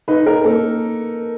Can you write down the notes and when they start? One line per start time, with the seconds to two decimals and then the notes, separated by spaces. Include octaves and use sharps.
0.08 D#4 B4
0.26 A#4
0.44 A#3 A4